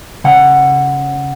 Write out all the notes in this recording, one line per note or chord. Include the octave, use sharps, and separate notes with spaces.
C#3 F#5